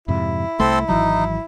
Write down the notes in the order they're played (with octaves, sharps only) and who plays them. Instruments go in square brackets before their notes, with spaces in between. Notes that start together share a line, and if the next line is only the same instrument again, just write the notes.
[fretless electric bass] F2 G#2 C3 [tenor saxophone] E4
[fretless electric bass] C2 A3 [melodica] C4 A4 C6
[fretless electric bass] G#1 E3 F#3 [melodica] D#4